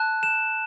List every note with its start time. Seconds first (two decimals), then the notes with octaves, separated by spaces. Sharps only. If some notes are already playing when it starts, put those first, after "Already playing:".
Already playing: A5 F#6
0.23 E7